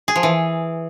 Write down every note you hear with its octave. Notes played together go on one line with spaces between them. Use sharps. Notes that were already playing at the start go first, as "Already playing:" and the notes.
G#4
F3
E3